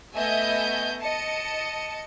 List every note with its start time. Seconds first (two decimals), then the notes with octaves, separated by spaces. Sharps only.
0.15 A3 B3 D#5 E5 G#5 G6
1.01 D#5 A5 C#7